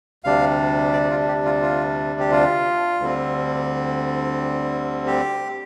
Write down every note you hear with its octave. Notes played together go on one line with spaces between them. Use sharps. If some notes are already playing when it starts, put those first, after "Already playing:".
D2 C3 G3 D4 F5
D5
F4
G4
F4
F4
G4
F4
D2 D3 G3 C4
G4